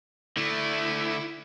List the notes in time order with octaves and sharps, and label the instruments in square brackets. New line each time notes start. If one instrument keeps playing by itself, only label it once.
[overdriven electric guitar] D3 A3 [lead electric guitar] E4